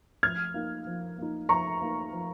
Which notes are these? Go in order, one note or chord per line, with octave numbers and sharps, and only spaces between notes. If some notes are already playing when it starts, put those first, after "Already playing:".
F3 F6 G#6
A#3 D#4
F3
A#3 D#4
F3 A#5 C#6
A#3 D#4
F3